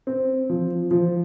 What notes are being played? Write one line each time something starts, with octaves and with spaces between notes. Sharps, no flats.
C4
F3
F3